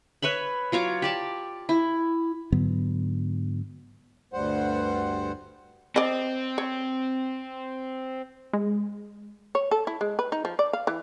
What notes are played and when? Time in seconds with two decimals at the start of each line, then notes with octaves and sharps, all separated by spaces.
0.22 B4 C#5 E5 B5
0.72 F#3 F4 C#5 D6
1.02 G4 D5 A5
1.69 E4
2.52 G#2 D3 F#3 B3
4.33 D2 G2 G3 C5 F#5
5.96 C4 D5 D#5
6.58 C#5
8.53 G#3
9.55 C#5
9.71 A4
9.87 E4
10.01 G#3
10.19 B4
10.32 D#4
10.45 F3
10.59 D5
10.73 F5
10.87 E3